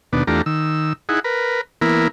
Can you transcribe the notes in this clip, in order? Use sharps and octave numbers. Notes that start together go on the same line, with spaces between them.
D#2 B2 B3 D4
E2 A3 D4 F4 G4 A#5
D#3 E6
D#4 E4 G#4 F#5
A#4 B4
E3 A#3 B3 E4 A#4